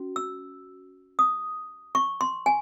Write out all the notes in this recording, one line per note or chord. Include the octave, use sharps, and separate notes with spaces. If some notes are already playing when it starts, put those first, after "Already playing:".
Already playing: C#4 F#4
E6
D#6
C#6
C6
G#5